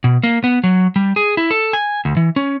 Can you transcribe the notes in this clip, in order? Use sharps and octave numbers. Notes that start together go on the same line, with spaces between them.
B2
A#3
B3
F#3
G3
G#4
E4
A4
G#5
D2
E3
C#4